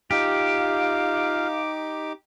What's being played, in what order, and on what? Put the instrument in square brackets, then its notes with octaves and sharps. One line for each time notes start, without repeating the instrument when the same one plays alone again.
[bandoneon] D#4 D6 [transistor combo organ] F4 [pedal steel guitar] G4 [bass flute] F5